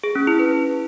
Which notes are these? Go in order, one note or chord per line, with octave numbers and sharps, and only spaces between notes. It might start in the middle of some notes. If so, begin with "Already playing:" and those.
G#4
C#4
E4
B4